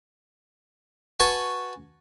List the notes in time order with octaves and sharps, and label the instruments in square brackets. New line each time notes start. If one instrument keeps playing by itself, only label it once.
[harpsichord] F#4 B4 G#5 A5 C#6